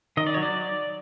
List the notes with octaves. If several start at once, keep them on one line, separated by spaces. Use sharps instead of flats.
D#3 D#5
D5
F#3 C#5
D5